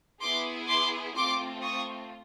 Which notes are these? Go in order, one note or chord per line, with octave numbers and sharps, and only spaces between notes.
B3 E4 G#4 C6 D6
C6 D6
A3 C4 F4 C6 D6
C#6 D#6